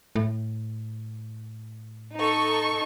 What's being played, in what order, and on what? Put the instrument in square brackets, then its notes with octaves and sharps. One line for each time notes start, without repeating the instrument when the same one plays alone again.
[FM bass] A2
[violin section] D#4 A4 C#6